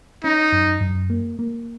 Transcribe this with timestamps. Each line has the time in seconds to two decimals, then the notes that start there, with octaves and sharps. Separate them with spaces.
0.24 C#4 D#4
0.52 F#2
0.81 F#2
1.10 A#3
1.39 A#3